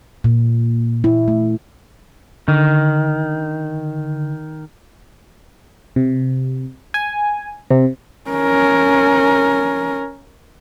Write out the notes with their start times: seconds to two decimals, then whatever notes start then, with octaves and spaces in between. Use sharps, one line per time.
0.24 A#2
1.04 E4
1.28 A3
2.48 D3 D#3
5.96 C3
6.94 G#5
7.71 C3
8.30 C#4 A#4